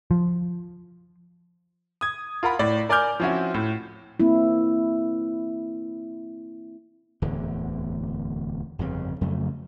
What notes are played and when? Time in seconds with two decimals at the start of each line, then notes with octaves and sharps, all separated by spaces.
0.11 F3
2.01 D#6 G#6
2.43 F4 A#4 F#5 B5
2.59 A2 D5
2.89 A#4 D5 G#5 D6 F6 G6
3.20 F3 C4 C#4 E4 F#4
3.54 A2
4.20 A#3 C4 E4
7.22 D1 E2 D3
8.79 G1 F2 C#3
9.21 F2 C#3 F#3 A3